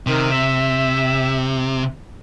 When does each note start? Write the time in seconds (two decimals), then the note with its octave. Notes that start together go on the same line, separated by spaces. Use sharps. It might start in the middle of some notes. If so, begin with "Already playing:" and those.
0.07 C3 D#3
0.32 E5